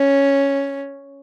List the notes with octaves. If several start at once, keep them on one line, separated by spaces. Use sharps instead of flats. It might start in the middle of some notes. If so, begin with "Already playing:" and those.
Already playing: C#4